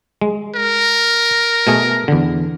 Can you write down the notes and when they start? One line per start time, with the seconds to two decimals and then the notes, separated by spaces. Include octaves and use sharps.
0.21 G#3
0.55 A#4
1.67 B2 A3 G#4
2.08 E2 D3